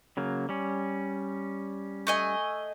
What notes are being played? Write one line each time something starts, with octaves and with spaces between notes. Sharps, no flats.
C#3 F#3 A#3
G3 C#4
A3 D#5 G#5